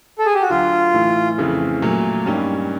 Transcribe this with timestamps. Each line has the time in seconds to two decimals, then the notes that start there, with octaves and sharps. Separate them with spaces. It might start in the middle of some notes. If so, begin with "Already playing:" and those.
0.19 A4
0.26 G#4
0.35 G4
0.42 F#4
0.49 D2 D3 F#3 F4
0.94 A2 E3 A3
1.38 F2 C#3 E3 A3
1.82 A#2 F#3 A3
2.26 G2 D#3 G3 A#3 C#4